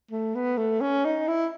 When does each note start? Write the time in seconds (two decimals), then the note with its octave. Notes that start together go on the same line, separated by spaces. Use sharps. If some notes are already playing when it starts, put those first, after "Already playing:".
0.11 A3
0.35 B3
0.57 A3
0.81 C#4
1.05 D#4
1.28 E4